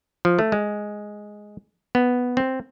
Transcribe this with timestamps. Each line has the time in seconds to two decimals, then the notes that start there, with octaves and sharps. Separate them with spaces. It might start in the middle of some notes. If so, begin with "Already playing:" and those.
0.25 F3
0.39 A3
0.52 G#3
1.95 B3
2.37 C4